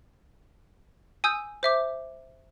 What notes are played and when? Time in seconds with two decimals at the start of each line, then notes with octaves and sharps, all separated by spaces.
1.24 G#5 D#6 E6 G6
1.63 C5 E5 D6